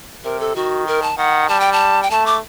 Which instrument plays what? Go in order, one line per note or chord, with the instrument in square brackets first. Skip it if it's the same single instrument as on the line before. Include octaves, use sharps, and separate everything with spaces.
[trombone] C3 [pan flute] A#4
[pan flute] A4
[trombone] D#3 [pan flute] F#4
[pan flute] A#4
A5
[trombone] D#3 [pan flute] F#5
[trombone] G3 [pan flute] A5
[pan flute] G5
A5
G5
[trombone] A3 [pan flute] A5
[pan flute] D6